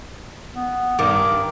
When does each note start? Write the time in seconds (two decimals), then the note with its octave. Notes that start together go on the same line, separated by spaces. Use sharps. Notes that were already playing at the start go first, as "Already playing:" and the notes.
0.53 B3
0.99 G2 D#3 D6